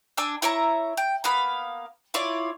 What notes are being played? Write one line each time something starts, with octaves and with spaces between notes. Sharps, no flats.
D4 G#5 D6 E6
E4 C#5 E5 A#5
G5
A#3 B3 F5 B5
E4 F4 C#5 D5